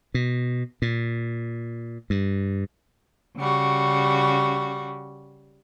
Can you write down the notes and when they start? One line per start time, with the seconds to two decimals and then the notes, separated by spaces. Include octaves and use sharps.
0.14 B2
0.82 A#2
2.10 G2
3.37 C#3 G3 F#4